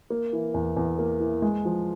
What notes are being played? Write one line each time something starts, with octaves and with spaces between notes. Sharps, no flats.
A#3
E3
E2
E2
A#3
E3
G#3
F3